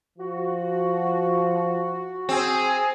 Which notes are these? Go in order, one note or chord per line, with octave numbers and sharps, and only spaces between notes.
F3 F#4
C4 G#4